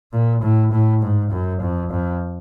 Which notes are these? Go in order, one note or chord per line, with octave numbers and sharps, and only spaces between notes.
A#2
A2
A2
G#2
F#2
F2
F2